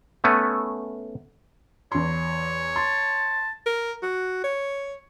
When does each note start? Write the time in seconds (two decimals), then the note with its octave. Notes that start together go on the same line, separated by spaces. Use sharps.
0.24 A3 B3 C#4
1.92 E2 C#5 C6
2.76 A5 C6
3.66 A#4
4.03 F#4
4.44 C#5